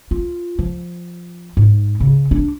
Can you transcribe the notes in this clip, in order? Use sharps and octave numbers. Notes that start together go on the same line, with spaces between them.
F4
F3
G#2
C#3
D4